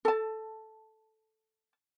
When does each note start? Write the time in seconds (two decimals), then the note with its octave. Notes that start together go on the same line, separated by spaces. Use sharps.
0.05 A4 A5